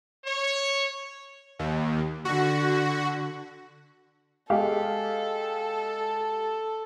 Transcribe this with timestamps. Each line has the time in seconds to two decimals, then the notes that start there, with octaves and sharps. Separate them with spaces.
0.25 C#5
1.59 D#2
2.25 D3 F#4
4.50 G#3 G4 A4 F5